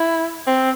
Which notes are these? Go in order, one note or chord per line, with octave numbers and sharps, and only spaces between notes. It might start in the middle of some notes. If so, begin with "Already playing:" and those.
Already playing: E4
C4